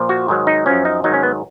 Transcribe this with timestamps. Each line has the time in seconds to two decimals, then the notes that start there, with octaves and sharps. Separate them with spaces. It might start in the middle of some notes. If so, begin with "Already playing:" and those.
Already playing: A#2 F3
0.09 F#4
0.28 G#2 D#3 F#3
0.47 D#4
0.66 F#2 F3 C#4
0.85 D#4
1.04 G#2 D#3 F#3 D#4
1.14 C#4
1.23 B3